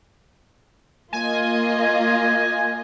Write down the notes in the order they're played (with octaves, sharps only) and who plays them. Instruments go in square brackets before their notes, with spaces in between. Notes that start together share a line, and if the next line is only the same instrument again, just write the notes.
[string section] A#3 F4 D#5 [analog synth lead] G#5